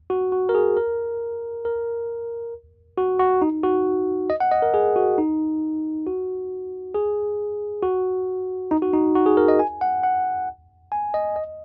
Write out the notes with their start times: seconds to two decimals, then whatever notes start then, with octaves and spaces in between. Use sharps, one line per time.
0.10 F#4
0.32 F#4
0.49 A#4
0.55 G#4
0.77 A#4
1.65 A#4
2.98 F#4
3.19 F#4
3.42 D#4
3.63 F#4
4.30 D#5
4.40 F#5
4.51 D#5
4.62 A#4
4.74 G#4
4.96 F#4
5.18 D#4
6.06 F#4
6.94 G#4
7.83 F#4
8.71 D#4
8.82 F#4
8.93 D#4
9.15 F#4
9.26 G#4
9.37 A#4
9.48 D#5
9.59 G#5
9.81 F#5
10.03 F#5
10.92 G#5
11.14 D#5
11.36 D#5